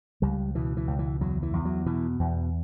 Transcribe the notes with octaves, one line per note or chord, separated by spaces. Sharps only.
C#2 G3
B2 E3
E3
C#2
E3
E2 F#3
E3
E2
F#3
B2 E3
E2